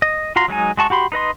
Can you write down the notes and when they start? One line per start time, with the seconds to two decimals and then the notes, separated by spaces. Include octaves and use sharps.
0.02 D#5
0.36 F4 F#4 A#5 C6
0.48 F#3 G#3 D#4 G#5
0.78 G#3 F#4 A5 C#6
0.90 F#4 G4 B5 C6
1.12 D#4 B4 D#5 C6